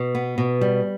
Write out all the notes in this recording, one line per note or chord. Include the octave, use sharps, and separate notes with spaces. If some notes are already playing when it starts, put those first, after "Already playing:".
Already playing: B2
B3
B2
G3